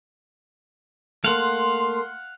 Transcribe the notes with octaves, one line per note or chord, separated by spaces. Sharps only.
A3 A#3 F5 F#5 C6